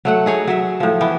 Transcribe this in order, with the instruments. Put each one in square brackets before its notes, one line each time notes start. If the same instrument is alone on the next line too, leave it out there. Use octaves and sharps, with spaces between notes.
[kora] F#3 A3 F#5
D#4 G#4 C#5
F#3 E5
A2 F3
E3 B3